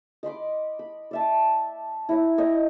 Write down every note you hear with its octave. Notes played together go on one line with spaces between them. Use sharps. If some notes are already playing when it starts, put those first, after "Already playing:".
D#5 B5 C6 D6
B5
D5 E5 A5
E4 C#5 A#5
C#5 D#5 G5 C#6